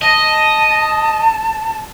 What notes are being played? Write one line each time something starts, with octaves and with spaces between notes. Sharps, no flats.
D#5 A5